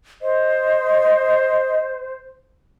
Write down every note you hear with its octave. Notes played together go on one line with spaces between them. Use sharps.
C5 D#5